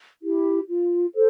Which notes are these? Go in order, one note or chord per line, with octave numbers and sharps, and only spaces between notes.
E4 G4
F4
A4 C5